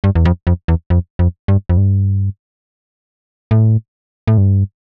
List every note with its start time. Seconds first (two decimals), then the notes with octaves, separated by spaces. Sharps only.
0.04 G2
0.15 E2
0.25 F2
0.47 F2
0.68 E2
0.90 F2
1.19 F2
1.48 G2
1.69 F2
1.77 G2
3.51 A2
4.27 A2
4.38 G2